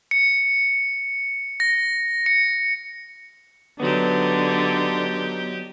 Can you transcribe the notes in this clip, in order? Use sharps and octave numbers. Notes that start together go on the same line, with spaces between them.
C#7
A#6
C#7
D3 F#3 B3 D#4 G4